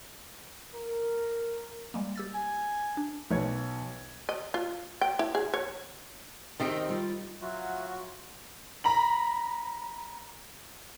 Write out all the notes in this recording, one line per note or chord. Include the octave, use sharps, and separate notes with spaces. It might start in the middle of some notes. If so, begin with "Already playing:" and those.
A#4
G3 G#3 A#3
G4 E6 A6
G#5
D4
B1 B3 C#5 G#6
D#5
F4
G5
E4
G#4
C#5
D#3 C4 G4 D#5 G5
G3 F4
F#3 F4 F#4 E5
A#5 B5 F#7